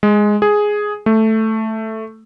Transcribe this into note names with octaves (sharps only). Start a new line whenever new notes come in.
G#3
G#4
A3